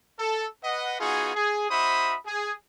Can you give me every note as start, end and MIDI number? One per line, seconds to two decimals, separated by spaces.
0.19 0.46 69
0.63 0.97 71
0.63 0.97 75
0.63 0.97 78
1.00 1.35 59
1.00 1.35 63
1.00 1.35 65
1.00 1.35 66
1.00 1.35 68
1.35 1.67 68
1.70 2.15 63
1.70 2.15 66
1.70 2.15 72
1.70 2.15 76
1.70 2.15 83
1.70 2.15 87
2.26 2.53 68